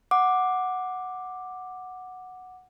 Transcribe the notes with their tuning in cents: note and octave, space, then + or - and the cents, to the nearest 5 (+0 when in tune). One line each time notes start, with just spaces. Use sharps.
F#5 -5 D6 +5